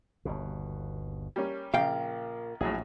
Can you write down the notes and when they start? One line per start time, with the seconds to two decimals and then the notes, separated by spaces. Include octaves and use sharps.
0.25 G1 D#2 B2
1.36 G3 A#3 C#4
1.74 A#1 A#2 C#3 F5 G5
2.61 A#1 A2 F#3 G#4